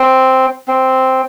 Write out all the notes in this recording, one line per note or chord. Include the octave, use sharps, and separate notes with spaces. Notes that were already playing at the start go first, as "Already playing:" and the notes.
Already playing: C4
C4